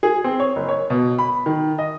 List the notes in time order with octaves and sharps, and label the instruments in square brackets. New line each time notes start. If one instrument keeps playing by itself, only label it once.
[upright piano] G#4
C4
C#5
F#1
C#5
B2
B5
D#3
D#5